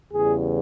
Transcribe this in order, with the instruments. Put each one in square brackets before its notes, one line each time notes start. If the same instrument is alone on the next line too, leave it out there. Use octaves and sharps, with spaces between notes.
[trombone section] E2 C#3 E3 G3 G#4